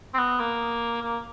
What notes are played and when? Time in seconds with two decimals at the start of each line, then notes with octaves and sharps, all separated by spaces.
0.14 C4
0.18 B3
0.39 A#3
1.02 A#3